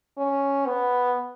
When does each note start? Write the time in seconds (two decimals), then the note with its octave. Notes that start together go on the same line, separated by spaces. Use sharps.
0.18 C#4
0.66 B3